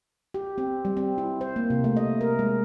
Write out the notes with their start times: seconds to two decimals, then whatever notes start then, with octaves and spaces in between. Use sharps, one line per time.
0.34 G4
0.58 C4
0.85 G3
0.97 C4
1.18 E4
1.41 C5
1.56 A#3
1.70 C3
1.84 A3
1.97 D#5
2.21 A#4
2.39 G#3